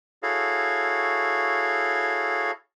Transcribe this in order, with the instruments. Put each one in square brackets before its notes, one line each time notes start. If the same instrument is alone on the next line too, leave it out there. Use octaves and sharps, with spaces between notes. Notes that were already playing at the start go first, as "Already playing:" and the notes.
[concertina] E4 F#4 G#4 A4 C#5 F5